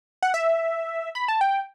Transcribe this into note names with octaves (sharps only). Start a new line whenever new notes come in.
F#5
E5
B5
A5
G5